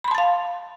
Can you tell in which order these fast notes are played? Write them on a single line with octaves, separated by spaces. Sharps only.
B5 C6 A5 A6 F5